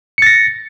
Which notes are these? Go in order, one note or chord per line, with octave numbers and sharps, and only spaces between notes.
A6 A#6 C#7